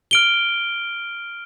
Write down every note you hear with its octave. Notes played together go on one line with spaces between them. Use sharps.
F6 D7 G7